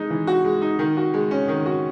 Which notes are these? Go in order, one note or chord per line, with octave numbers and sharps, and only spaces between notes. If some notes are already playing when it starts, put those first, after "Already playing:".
Already playing: G#3 D#4
E3
F#4
G#3
D#4
D#3
F#4
G#3
C#4
D#3
F#4